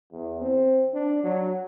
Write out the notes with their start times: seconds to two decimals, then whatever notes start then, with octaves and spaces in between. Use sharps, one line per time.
0.12 E2
0.41 C4
0.94 D4
1.24 F#3